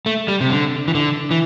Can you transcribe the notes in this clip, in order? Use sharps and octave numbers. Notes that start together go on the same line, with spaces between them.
A3
G3
C3
D3
E3
D3
E3